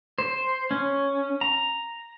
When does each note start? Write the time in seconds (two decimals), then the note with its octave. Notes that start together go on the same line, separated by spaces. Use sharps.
0.19 C5
0.71 C#4
1.41 A#5